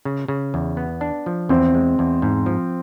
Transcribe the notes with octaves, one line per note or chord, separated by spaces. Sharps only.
C#3
C#3
E2
B3
D4
F3
E2 C4
G#3
E2
G#2
F3